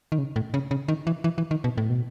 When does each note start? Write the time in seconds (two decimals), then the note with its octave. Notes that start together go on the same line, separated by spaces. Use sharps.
0.12 D#3
0.18 C#3
0.36 A2
0.54 C#3
0.71 C#3
0.88 D#3
1.07 E3
1.24 E3
1.38 E3
1.51 D#3
1.64 B2
1.78 A2
1.90 B2